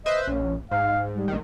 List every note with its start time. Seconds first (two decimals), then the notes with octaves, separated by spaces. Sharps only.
0.06 B4 C5 D#5 E5
0.27 A#1 C#4
0.71 G#2 F5
1.14 G3
1.28 A#1 D#3